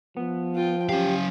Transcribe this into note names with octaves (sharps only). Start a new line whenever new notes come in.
F3 B3
F4 G5
F#3 C#4 G4 F5